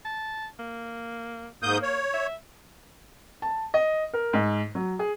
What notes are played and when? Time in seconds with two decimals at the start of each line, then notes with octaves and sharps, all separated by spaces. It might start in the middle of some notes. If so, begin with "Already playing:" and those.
0.05 A5
0.59 A#3
1.63 G#2 A#3 D#6 G6
1.83 C#5
2.14 E5
3.42 A5
3.74 D#5
4.13 A#4
4.33 G#2
4.75 F#3
4.99 G#4